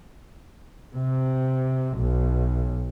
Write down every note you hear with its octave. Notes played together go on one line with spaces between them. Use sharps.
C3
B1